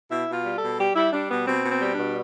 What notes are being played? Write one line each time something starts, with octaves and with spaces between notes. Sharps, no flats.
B2 E4
B2
F4
G3
A4
B2
G3 G4
G3 E4
G3 D4
B2 B3
B2 C4
B2
C4
G3
D4
B2